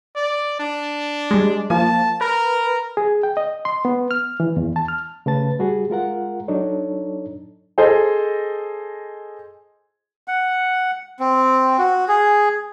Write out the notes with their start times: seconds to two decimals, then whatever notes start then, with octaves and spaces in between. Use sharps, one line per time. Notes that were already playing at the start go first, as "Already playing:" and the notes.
0.16 D5
0.60 D4
1.31 G3 G#3
1.70 F3 A#3 F4 A5
2.21 A#4 B4
2.97 G#4
3.23 G5
3.37 D#5
3.65 C6
3.85 B3
4.11 F6
4.40 E3
4.57 E2
4.76 A5
4.88 F6
5.26 C#3 A3 B4 A5 A6
5.59 G3 F#4 G#4
5.90 G#3 F4 A#4 F#5
6.48 F#3 D4 D#4 A4 C#5
7.78 G#4 A4 C5 D#5
10.28 F#5
11.20 C4
11.79 F#4
12.08 G#4